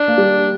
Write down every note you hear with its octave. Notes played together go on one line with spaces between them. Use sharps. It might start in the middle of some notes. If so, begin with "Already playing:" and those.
Already playing: D4
A#3
G3